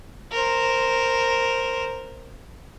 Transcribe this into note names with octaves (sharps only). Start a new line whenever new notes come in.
A#4 C5